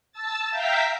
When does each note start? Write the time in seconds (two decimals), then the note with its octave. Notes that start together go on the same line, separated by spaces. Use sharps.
0.12 A5 E6 A6
0.50 E5 F5 G5 A#5 G6 B6